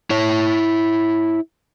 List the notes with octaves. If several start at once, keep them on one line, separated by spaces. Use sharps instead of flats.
E4 C#5